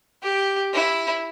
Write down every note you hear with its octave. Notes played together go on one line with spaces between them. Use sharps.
G4
E4